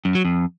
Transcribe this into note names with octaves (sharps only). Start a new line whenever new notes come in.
F#2
F#3
F2